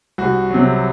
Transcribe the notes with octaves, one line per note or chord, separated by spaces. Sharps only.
C2 F#4
C3 F#3